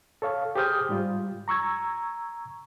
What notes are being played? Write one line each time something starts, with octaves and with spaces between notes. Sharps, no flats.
A4 C#5 F5
G4 G#4 C5 D#6 F6 G6
G#2 G3 F4
A#5 C#6 E6 G#6